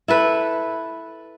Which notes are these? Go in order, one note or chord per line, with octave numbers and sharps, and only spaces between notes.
E4 A4 B4